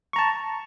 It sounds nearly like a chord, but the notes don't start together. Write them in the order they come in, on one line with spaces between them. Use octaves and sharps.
C#6 A#5 A5